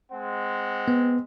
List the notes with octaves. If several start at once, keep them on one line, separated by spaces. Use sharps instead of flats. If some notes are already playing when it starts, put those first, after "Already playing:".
G#3 C4 F#5
B3